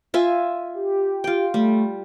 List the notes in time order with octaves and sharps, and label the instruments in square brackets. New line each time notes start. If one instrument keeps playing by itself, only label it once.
[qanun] F4 E5 G#5
[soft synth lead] G4
[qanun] F4 G5
[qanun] G3 [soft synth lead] A3